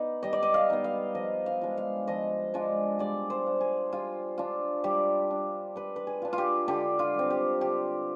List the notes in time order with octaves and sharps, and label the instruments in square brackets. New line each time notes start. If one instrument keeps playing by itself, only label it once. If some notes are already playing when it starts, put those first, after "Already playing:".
Already playing: [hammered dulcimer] B3 D#4 D5
G3 D#5
D5
D#5
F5
B3 D#4
F5
F3 D#5
F5
G#3 D4 F4
F5
F3 D#5
G#3 D4 F4
G3 D5
C5
D4 F4
G#4
G3 F4
D4 F4
G3 G4
D4 F4
G3 B4
B4
G#4
D4 F4
F4
G4
D3 G4
F4
G3
C4
G4
D3 G4